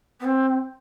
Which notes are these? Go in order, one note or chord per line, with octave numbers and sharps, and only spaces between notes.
B3
C4